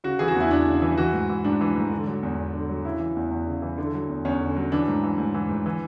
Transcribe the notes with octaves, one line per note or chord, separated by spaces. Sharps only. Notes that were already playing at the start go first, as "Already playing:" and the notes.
C#3 F#4
E3 G#4
F#4
E2 E4
E2 D4
C#3
E3
E3 F#4
G#2
E3
G#2 D4
E3
G#2
D3
F#3
E2
E2
D3
F#3
C#3 E4
E3
E2
E2
C#3
E3
D3
F#3
E2
E2 C#4
D3
F#3
E3 D4
G#2
E3
G#2
E3
G#2
E3